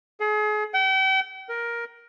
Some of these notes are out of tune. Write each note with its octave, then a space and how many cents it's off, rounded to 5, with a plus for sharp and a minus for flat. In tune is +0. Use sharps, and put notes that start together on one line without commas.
G#4 +35
G5 -40
A#4 +10